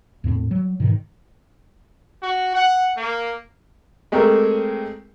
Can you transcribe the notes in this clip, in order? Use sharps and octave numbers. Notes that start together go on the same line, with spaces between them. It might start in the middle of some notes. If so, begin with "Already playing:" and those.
E2 A2 A#3 C4
F#3 G3
G#2 B2 D#3 E3
F#4
F#5
A#3
G#3 A3 C4 G4 G#4 A#4